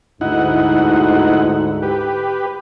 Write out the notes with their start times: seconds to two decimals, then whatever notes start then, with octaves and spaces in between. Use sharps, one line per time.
0.21 D2 G#2 D#4 E4 F#5
1.82 G4 B4